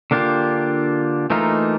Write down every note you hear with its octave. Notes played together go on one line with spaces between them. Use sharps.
D3 A#3 D4 F4 G4
E3 A3 A#3 D#4 F4